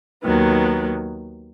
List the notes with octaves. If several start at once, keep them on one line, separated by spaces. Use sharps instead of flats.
D#2 D#3 F#3 B3